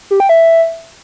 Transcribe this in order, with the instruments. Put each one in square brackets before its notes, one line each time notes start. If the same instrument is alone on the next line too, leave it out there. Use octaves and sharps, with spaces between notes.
[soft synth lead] G4
G5
E5